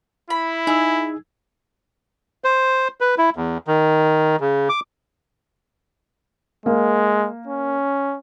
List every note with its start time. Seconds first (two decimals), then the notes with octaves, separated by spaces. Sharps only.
0.30 E4 B5
0.67 D#4 G#4 E6
2.44 C5
3.01 B4
3.18 E4
3.36 E2
3.67 D#3
4.40 C#3
4.69 D6
6.66 G#3 A#3
7.48 C#4